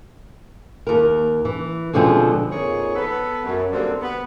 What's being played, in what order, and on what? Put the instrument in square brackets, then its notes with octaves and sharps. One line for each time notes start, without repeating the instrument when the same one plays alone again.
[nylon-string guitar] D#2 A#4
E3
B2 D3 F3 G#3 C4
[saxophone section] F2 A#2 F3 D#4 G#4 C#5
B3 A4 B4
F#2
B2 D3 G3 A#3 C4
B3